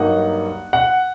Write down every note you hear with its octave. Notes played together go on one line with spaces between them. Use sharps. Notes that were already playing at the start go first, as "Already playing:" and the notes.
Already playing: G2 F#3 A#3 D#4 F#5
F#5